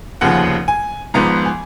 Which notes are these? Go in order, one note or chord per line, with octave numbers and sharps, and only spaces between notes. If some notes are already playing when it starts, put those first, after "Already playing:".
F1 D#2 C#3 F3 F#5
G#5
G#1 G#2 F3 B3 A#5
G#5